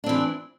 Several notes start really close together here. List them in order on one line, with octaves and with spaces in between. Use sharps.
D4 C4 E3